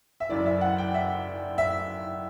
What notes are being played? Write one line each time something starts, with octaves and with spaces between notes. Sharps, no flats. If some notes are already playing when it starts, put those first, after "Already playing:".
E5
F#1 F#2 E3 D5
E5
F#5
G5
E5
E5